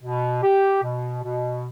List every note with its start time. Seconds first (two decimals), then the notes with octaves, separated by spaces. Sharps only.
0.03 B2
0.43 G4
0.83 B2
1.23 B2